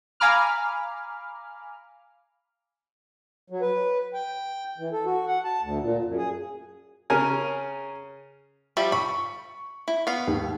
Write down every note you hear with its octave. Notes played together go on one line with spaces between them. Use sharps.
F5 G#5 A#5 B5 D6 F6
F#3
B4
G5
E3
A4
F#4
F#5
A5
D2
A#2
F#2
G#4
C#3 C#4 A#4 G#5
F3 G3 E5
B5 C#6
E4
B3 F5
D#2 G#2